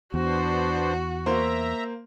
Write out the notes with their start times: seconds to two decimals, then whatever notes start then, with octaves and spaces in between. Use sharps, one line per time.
0.14 E2 B3 D4 F#4 C5
1.26 A#3 C5 E5 A#5